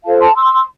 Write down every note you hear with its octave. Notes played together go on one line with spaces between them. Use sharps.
F4 A4 C5 F5 A5
A5 C6
C6 E6